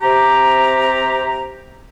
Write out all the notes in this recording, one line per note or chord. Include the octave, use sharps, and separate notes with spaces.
C3 G4 A#5